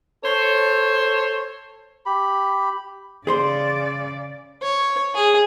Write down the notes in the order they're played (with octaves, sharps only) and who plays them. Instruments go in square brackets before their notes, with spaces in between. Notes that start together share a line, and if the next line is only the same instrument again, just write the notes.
[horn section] A4 C5 C#5
[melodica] G4 B5
[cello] C#3 D5 [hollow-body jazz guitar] G#4 C5 C6
[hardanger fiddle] C#5
G#4